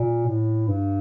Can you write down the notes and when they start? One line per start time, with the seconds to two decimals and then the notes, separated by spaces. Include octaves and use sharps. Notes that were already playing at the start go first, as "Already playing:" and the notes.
Already playing: A#2
0.27 A2
0.68 G2